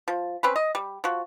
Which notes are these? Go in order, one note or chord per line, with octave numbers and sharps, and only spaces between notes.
F3
C4 C#4 B4
D#5
G3
F3 F#4